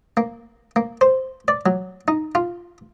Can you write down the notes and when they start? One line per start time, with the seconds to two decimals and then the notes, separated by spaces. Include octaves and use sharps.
0.17 A#3
0.76 A#3
1.01 C5
1.48 D5
1.66 F#3
2.08 D#4
2.35 F4